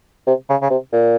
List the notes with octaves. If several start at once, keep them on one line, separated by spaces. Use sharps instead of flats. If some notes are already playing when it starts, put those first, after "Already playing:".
C3
C#3
C#3
C3
A#2